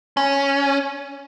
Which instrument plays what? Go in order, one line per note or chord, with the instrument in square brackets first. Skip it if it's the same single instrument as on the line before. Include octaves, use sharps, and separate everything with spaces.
[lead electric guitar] C#4